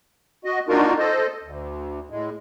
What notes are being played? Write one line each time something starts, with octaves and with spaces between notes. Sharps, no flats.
F#4 D#5
A#3 D4 D#4 F4 F#4 A#4
A4 C5 D#5
D2
A2 G#3